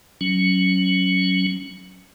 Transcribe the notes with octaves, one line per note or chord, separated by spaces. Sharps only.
F#3 C#4